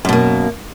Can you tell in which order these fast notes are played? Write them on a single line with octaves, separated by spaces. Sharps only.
F#2 B2 A#3